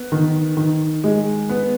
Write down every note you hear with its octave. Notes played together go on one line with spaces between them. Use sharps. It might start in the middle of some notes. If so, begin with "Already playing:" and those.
Already playing: B3
D#3
D#3
G#3
B3